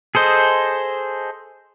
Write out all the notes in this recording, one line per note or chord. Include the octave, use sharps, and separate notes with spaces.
G#4 A4 C5 D#5